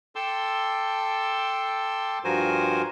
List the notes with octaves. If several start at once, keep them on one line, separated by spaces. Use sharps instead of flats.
A4 G5 A5 C6 D6 E6
G2 F3 F#4 A#4 C5 G#5